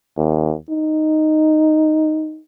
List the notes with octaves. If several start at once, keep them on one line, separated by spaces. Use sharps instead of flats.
D#2
D#4